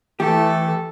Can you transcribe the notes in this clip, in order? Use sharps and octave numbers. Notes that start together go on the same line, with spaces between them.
E3 A3 G4 A4